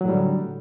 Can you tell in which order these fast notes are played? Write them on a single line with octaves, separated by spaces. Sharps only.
F#3 A2 G3 D3